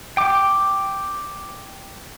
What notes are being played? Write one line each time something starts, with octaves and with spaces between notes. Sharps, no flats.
G5 D6